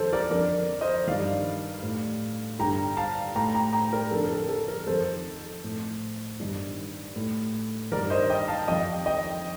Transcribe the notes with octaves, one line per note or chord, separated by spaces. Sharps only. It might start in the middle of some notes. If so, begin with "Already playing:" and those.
Already playing: F2 D#3 A4 C5
A#4 D5
F2 D3 A#4 D5
C5 D#5
G2 D#3 D5 F5
A2
G2 D3 G5 A#5
F5 A5
A2 G5 A#5
G5 A#5
G5 A#5
A#4 D5
F2 D3 A4
A#4
A4
A4
A#4
F2 D#3 A4 C5
A2
G2 D#3
A2
G2 D#3 A#4 D5
C5 D#5
D#5 G5
F5 A5
F2 D#3 D#5 G5
D#5 G5